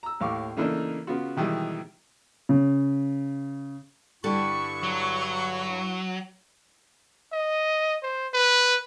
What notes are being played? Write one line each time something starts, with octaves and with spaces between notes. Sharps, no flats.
A#5 E6
D#2 A2 F5 C#6 D6
C#3 E3 A3 A#3 D4 D#4
C#3 B3 F4 F#4
B2 D#3 E3 G3 G#3
C#3
G2 D3 G3 E4 A4 C#6
F#3
D#5
C5
B4